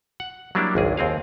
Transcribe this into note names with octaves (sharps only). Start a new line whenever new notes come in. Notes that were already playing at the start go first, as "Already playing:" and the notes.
F#5
F#3 G3 A#3 D4 E4
G#1 C#2 G#4
D#2 C4 G#4 F5